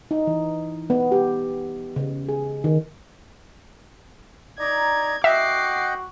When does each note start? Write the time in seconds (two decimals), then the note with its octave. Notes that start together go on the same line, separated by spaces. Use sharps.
0.11 D#4
0.27 E3
0.90 B3
1.12 G4
1.96 C#3
2.29 G#4
2.64 D#3
4.59 D#4 D5 A#5 G#6
5.24 F#4 D#5 E5 F#5 G5 D6 C7